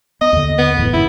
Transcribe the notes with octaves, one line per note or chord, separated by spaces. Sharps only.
B3 D#5
D#2 D3
B3
D#1 E2 A2
F2 G#2 C#3 E4